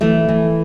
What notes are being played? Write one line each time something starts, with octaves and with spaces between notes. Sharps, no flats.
E3 A3
E3